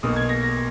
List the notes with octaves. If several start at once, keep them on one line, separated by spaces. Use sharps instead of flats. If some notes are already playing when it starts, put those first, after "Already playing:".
B1 B2 A#3 D#6
G#6
A#6
A#6